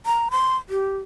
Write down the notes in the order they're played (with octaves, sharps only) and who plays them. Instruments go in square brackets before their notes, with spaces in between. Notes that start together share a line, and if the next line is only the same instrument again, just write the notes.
[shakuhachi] A#5
C6
G4